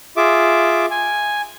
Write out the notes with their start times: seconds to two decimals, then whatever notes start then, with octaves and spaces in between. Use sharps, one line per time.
0.17 F4 G#4 E5 D6
0.91 G#5